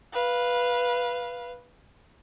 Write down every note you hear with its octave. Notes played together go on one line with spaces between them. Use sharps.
B4 F5